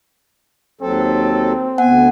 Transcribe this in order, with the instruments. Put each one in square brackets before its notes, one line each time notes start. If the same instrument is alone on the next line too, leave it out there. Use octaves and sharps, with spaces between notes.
[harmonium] D#2 F#3 A4 [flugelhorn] C4
[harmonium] D2 G#5 [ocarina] B3 [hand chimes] F#5